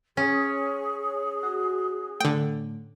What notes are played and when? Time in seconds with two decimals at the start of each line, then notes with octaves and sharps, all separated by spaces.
0.17 C#4 G#4 C#5
1.43 F#4
2.20 A2 D3 G5